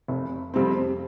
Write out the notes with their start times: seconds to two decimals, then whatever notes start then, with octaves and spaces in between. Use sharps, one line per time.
0.08 F1
0.54 F2 C3 G3 C4